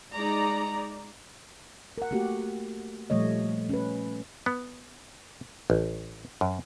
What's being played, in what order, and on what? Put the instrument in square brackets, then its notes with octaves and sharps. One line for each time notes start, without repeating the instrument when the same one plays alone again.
[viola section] G#3 D#4 D5 A#5
[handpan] A#4 F#5
A3 A#3 F#4 G4
A#2 F3 G3 A3 C#5 D#5
C#4 B4
[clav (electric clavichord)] B3
A1
F#2